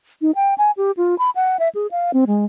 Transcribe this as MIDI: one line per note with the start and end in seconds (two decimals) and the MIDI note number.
0.22 0.31 63
0.35 0.54 79
0.58 0.71 80
0.77 0.91 67
0.97 1.17 65
1.19 1.30 83
1.36 1.57 78
1.59 1.69 76
1.75 1.87 68
1.91 2.11 77
2.14 2.25 60
2.27 2.45 56